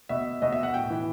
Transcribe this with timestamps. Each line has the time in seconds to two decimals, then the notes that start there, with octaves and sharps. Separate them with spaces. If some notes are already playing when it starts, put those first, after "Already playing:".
0.09 B2 E5
0.42 B2 D#5
0.52 E5
0.63 F#5
0.74 A2 G5
0.90 E3